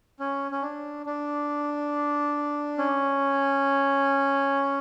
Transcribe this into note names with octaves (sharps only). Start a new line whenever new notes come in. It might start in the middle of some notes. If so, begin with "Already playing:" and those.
C#4
C#4
D4
D4
C#4